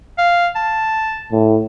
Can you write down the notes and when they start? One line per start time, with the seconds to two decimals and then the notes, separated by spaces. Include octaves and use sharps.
0.18 F5
0.56 A5
1.32 A2